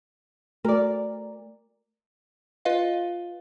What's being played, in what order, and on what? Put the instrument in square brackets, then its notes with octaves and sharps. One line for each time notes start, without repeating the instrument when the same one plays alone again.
[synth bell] A3 [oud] A#4 D5
[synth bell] F4 B4 D#5 F5